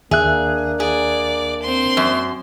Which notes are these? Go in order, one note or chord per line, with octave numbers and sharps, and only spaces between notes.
D#2 A#3 D4 G#4 E5 F#6
G#4 D5
C4 C6
F#2